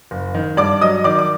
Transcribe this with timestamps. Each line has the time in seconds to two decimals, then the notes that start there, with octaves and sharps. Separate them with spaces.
0.11 F#1
0.35 D#3
0.57 G2 D5 D6
0.81 F#3 D#5 D#6
1.04 D#3 D5 D6
1.19 D6